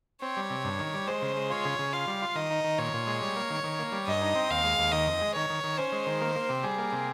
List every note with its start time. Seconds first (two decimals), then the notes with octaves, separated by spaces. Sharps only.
0.22 C4 C#5
0.37 G3
0.50 C3
0.65 G2
0.79 D#3
0.94 G3
1.07 G#3 C5
1.22 C#3
1.36 G#3
1.50 F4 C#5
1.65 C#3
1.79 C#3
1.93 F4 F5
2.07 G3
2.22 F4
2.35 D#3 D#5
2.51 D#4
2.64 D#3
2.78 A#2 C#5
2.93 A#2
3.07 G#3
3.22 G3
3.36 A#3
3.50 D#3
3.64 D#3
3.79 A#3
3.92 G3
4.07 G2 D#5
4.22 D#4
4.35 C4
4.50 D#2 F5
4.64 G#3
4.79 D#2
4.92 D#3 D#5
5.07 F2
5.21 G#3
5.35 D#3 C#5
5.50 D#3
5.64 D#3
5.78 C#4 C5
5.92 G#3
6.07 D#3
6.21 A#3
6.35 A#3
6.49 C3
6.63 G3 G#4
6.78 A#3
6.92 C3